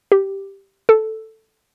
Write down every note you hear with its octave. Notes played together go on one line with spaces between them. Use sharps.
G4
A4